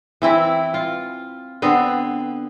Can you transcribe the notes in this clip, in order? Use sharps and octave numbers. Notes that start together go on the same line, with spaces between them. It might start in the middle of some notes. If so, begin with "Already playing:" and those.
E3 C4 E4
F4
D3 B3 C4